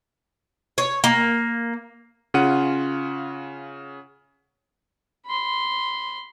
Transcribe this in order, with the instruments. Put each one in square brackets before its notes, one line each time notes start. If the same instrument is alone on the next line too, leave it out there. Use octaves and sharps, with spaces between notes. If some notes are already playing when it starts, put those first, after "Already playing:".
[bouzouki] C#5
A#3
[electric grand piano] C#3 C#4 F4 F#5 D#7
[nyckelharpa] B5 C6